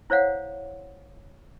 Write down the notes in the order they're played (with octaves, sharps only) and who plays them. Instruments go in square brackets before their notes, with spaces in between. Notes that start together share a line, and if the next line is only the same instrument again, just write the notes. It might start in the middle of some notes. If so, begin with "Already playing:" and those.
[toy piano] E4 C5 C#5 F5 F#5